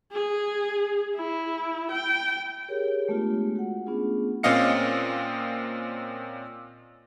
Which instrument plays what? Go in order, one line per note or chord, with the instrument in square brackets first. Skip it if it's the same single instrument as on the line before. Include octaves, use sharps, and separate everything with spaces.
[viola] G#4
E4
G5
[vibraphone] G4 G#4 A#4 C#5
G#3 A3 B3 D4 F4 G4
F#4 F#5
A3 B3 C#4 D4 F4 G#4
[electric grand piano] A#2 C4 C#4 D#5 F5 C#7